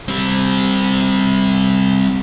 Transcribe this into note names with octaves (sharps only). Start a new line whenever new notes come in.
G3 C4